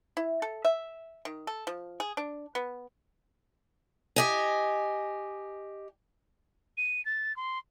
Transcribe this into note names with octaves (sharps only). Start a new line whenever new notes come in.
E4
A4
E5
D#3
A4
F3
G#4
D4
B3
G4 D#5 G#5
D#7
A6
C6